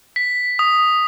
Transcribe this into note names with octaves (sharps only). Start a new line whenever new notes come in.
B6
D#6